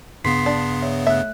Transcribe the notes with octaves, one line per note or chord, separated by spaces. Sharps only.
G2 C#3 B3 C6 B6 C7
D4
C#5 E5
A3 E5 F#6